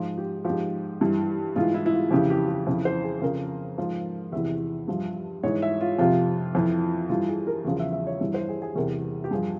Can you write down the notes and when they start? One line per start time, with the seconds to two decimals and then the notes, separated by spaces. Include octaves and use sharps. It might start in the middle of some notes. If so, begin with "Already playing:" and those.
Already playing: G#2 F3 F4
0.18 G4
0.45 G#2 F3 G4
1.01 G2 E3
1.56 G#2 E3 F4
1.74 E4
1.86 E4
1.93 F4
2.11 F2 C#3 E3 G4
2.30 G4
2.48 G4
2.67 F2 C#3 E3
2.85 C5
3.03 G#4
3.22 F2 C#3 F3 A#4
3.78 G#2 F3
4.32 E2 C3 E3 E5
4.88 G2 F3
5.43 G#2 E3 C#5
5.62 E5
5.81 F4
5.99 F2 C3 F3 F4
6.55 F2 E3
7.09 G2 E3 F4
7.28 G#4
7.47 A#4
7.65 E2 C#3 F3
7.79 E5
7.93 E5
8.07 C#5
8.20 G2 E3 E5
8.34 C5
8.49 G#4
8.62 G#4
8.76 E2 C3 E3 A#4
9.24 G4
9.31 G2 F3 G#4